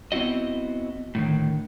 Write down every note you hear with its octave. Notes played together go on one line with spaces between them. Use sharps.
B3 C4 E4 F#4 D#5
A2 D3 D#3